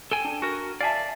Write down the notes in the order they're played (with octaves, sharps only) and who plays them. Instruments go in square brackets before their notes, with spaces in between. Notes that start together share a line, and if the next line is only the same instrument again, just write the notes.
[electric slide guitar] A4 G5 G#5
[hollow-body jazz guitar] D4
[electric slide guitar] F#4 A#4
[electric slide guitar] D5 E5 [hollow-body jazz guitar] F5 G#5 A5